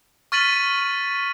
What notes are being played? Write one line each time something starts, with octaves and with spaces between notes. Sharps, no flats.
C#6 F6 A6 B6 D#7 F#7